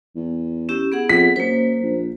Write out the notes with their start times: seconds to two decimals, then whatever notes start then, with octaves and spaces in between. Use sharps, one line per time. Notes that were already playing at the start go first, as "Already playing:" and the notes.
0.16 E2
0.69 C#4 E4 G4
0.92 B3 G#4 F#5
1.09 F2 B6
1.36 F#2 A#3 C5
1.83 A#1